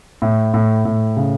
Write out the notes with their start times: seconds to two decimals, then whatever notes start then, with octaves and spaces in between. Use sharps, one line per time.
0.22 A2
0.54 A2
0.85 A2
1.17 C#3